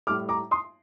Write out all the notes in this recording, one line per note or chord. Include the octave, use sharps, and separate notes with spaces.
A2 G3 D6 F6
A#5 D6
C6 D#6